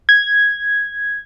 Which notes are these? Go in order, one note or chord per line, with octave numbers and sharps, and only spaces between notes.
G#6